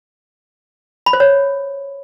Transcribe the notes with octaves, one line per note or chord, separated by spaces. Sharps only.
B5
C5
C#5